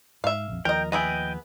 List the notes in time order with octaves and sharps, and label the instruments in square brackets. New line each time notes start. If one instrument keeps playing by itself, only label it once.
[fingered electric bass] G#2 [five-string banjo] E5 F5
[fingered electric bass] A#1 F2
[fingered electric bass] D#2 F3 [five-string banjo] A#4 D#5 [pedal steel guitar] G5
[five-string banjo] B3 G#4 E5 [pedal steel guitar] D#5 G5